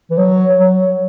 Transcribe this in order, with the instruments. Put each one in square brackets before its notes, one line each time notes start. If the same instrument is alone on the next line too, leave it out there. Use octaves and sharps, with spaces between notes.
[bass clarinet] E3
F#3
F#3